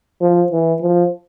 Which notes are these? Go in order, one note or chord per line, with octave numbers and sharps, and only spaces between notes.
F3
E3
F3